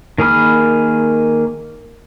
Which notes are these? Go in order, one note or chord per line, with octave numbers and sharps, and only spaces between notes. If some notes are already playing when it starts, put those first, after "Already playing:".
D#3 A#3 G#4 B5 F6